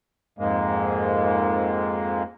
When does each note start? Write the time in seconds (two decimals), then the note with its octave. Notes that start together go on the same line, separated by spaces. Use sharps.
0.39 F2 G#2 G#3 A#3